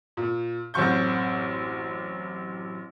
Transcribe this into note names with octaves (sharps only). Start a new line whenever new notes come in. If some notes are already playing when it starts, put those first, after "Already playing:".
A#2
A1 F#2 C4 C#6 G6